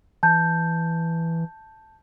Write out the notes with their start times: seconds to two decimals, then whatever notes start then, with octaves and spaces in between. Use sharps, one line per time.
0.23 E3 A5 G6